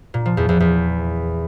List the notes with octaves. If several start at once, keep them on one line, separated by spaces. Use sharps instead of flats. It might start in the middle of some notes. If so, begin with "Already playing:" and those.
A#2
F3
E2
E2
E2